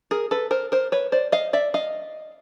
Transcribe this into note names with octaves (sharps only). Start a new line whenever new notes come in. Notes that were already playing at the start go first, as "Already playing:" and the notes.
G#4 A#4
A4 B4
A#4 C5
A#4 C5
B4 C#5
C5 D5
D#5 F5
D5 E5
D#5 F5